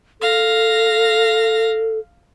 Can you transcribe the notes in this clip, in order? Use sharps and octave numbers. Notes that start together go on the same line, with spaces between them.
A4 F5 A#6